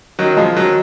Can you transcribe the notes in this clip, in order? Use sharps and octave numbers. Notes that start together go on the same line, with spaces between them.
D#3 F#3
F3 G#3
D#3 F#3